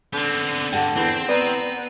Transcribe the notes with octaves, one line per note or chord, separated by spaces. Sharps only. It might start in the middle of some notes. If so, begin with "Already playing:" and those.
D3 B3 C4
G2 A4 F#5 G5
E2 C4
B3 D5 A#5